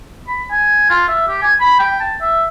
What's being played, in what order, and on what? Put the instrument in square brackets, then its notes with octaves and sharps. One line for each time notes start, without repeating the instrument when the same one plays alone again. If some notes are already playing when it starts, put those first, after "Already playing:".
[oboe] B5
G#5
F4
E5
G4
G#5
B5
G5
A5
E5